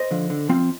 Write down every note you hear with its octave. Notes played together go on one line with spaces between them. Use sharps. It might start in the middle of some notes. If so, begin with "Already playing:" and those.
Already playing: C5 D#5
D3 F3
D3
F3 C4 F4